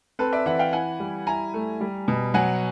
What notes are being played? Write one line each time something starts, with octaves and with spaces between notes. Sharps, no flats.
C4 A4 B4
D5 E5
E3 E5 F#5
F5 G5
E4 F#5 G#5
G3
E4 G#5 A#5
A3
G3
B2
F#3 F#5 G#5